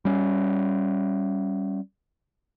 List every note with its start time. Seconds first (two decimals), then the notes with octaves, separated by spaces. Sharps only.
0.05 G3 C#4